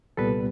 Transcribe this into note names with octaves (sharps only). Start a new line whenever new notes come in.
C2 A#2 G3 B3 A4 B4